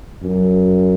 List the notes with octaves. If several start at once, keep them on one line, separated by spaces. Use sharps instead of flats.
F#2